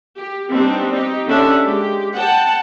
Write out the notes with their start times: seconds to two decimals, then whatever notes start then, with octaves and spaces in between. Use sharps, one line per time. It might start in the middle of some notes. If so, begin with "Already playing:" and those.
0.17 G4
0.50 G3 B3 C4 D4 D#4
0.92 D#4 G4
1.27 D3 C#4 D4 G4 E5
1.61 G#3 G4
2.15 F#5 G5 A5